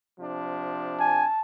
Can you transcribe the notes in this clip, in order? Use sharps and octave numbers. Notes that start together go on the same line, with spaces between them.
C3 F3 D4
G#5 A5